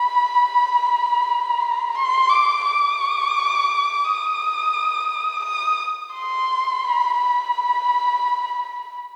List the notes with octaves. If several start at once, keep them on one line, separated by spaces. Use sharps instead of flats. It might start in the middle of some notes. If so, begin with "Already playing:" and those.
Already playing: B5
C6
D6
D6
D#6
D#6
C6
B5
B5